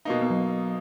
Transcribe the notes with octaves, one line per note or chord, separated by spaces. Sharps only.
B2 A#3 D#4
B3
F#3